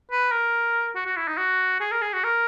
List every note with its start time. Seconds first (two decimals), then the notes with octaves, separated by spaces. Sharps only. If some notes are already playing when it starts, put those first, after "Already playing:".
0.11 B4
0.32 A#4
0.95 F#4
1.06 F#4
1.17 E4
1.28 D#4
1.38 F#4
1.80 G#4
1.91 A#4
2.02 G#4
2.13 F#4
2.24 A#4